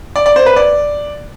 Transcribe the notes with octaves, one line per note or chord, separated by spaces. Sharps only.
D5
D5
C5
B4
D5